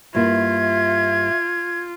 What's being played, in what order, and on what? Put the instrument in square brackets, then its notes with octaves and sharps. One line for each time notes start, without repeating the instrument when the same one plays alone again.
[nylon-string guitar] G2 A#3 E4 [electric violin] F4 [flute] E5 [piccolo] G#6